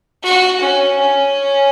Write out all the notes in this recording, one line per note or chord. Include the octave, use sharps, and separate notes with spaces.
F#4
C#4
C#4